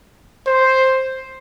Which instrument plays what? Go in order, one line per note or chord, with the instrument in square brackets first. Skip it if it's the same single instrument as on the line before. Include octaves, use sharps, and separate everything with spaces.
[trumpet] C5